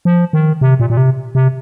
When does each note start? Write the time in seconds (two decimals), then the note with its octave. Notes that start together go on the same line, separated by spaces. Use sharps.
0.05 F3
0.33 D#3
0.61 C3
0.80 A#2
0.90 A#2
0.97 C3
1.35 C3